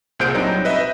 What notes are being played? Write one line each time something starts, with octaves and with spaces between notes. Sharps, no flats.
C2 A#2 G#4 C5 G6 D7
F#3 G3 C4 D4 D#4
B4 D#5 E5